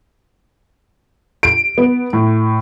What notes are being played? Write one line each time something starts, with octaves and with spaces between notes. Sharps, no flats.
D7
B3
A2